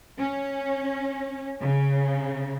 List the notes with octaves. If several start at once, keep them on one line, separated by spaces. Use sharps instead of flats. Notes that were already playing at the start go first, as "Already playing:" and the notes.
C#4
C#3